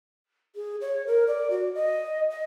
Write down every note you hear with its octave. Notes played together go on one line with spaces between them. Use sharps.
G#4
C#5
A#4
D5
F#4
D#5
D#5